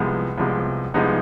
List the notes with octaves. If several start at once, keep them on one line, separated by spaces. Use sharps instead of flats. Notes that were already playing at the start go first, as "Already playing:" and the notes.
Already playing: C2 C3 F3 G#3 B3
C2 C3 F3 G#3 B3
C2 C3 F3 G#3 B3 D#4